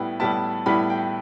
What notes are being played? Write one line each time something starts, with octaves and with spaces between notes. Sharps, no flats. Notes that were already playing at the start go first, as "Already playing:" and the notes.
Already playing: A2 G3 B3 E4 G5
A2 G3 B3 E4 A5
A2 G3 B3 E4 B5
G5